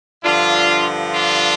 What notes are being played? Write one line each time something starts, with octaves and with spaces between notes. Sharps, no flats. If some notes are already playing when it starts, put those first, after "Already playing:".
G2 D3 F3 D4 F4
D4 F4